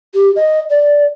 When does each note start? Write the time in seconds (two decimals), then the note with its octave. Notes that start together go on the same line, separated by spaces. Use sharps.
0.14 G4
0.36 D#5
0.70 D5